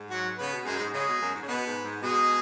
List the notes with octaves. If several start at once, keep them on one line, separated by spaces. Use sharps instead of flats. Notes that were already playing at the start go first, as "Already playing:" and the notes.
Already playing: G#2
F#3 F#4
C#3 B3 B4
B2
F#2 G#3 G#4
G#2
C#3 G#3 G#4
B2
F#2
G#2
C#3
B2 B3 B4
G#2
G#2
B2 G#3 G#4